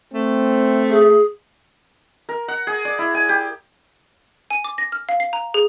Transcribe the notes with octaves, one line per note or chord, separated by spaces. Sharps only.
A3 C4
G#4
A#4
F#5
G#4
D5
E4
G#5
G4
G#5
D6
A#6
F6
F5
C7
A#5
G#4